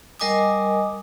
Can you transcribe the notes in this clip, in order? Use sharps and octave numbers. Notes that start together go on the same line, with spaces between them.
G3 A#4 D#5 G#5 D6 D#6